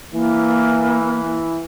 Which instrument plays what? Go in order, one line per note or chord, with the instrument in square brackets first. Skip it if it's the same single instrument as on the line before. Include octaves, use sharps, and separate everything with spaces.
[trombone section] E3 [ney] A#3